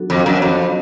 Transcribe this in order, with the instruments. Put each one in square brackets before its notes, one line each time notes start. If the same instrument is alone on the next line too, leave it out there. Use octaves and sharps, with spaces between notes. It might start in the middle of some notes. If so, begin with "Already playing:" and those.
Already playing: [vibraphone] F#3 B3 D4 F#4 A4
[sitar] F2
F#2
F2